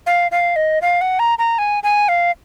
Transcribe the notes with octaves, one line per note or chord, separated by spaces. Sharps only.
F5
F5
D#5
F5
F#5
A#5
A#5
G#5
G#5
F5